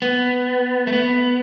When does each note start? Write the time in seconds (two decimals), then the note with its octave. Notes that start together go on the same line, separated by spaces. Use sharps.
0.02 B3
0.87 A3
0.93 B3